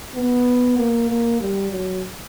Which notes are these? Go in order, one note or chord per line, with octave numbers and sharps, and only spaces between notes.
B3
A#3
A#3
G3
F#3